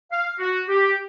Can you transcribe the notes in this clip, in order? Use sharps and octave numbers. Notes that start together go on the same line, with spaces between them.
F5
F#4
G4